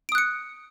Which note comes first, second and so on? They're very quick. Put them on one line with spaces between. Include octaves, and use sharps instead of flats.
D7 D#6 F#6 C#7